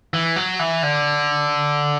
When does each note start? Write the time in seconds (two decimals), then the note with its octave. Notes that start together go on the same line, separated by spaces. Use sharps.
0.14 E3
0.36 F#3
0.59 E3
0.83 D3